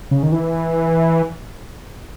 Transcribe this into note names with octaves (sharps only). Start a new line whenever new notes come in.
C#3
D#3
E3